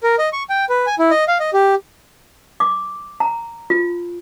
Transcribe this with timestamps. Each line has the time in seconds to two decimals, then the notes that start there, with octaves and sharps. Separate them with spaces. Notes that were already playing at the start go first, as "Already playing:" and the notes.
0.03 A#4
0.19 D#5
0.33 C#6
0.50 G5
0.69 B4
0.87 G#5
0.99 E4
1.11 D#5
1.28 F5
1.40 D#5
1.53 G4
2.60 D6
3.20 A#5
3.70 F4